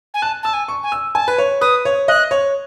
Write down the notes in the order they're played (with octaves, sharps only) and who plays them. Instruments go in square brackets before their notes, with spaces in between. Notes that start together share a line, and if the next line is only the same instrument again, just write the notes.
[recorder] G#5
[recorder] A5 [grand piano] F#6
[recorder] A5 [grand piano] E6
[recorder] G#5
[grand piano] C#6
[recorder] G#5
[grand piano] E6
[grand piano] G#5 [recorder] A5
[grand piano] B4
C#5
[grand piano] B4 [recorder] D#6
[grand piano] C#5
[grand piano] D#5 [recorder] F#6
[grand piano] C#5